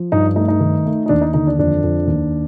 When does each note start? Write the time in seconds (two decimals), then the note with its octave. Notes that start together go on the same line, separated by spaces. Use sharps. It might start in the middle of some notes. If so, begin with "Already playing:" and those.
Already playing: F3
0.12 G2 D#4
0.36 A3 D#4
0.48 D#4
0.60 D#3
0.86 A3
1.06 D#4
1.09 D#2 D4
1.21 D#4
1.34 D3 D#4
1.47 D4
1.58 F2 D4
1.83 F2
2.07 D#2